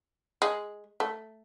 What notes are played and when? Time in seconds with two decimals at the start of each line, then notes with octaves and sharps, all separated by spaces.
0.42 G#3
1.00 A3